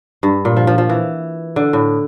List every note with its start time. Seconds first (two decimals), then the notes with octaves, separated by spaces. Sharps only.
0.23 G2
0.45 A#2
0.56 F3
0.67 F3
0.78 F3
0.89 E3
1.56 D3
1.73 A2